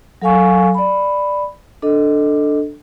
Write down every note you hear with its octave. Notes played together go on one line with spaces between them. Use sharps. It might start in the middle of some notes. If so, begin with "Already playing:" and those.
F#3 A4 F5 G#5 C#6
D5 B5
D4 A4 D#5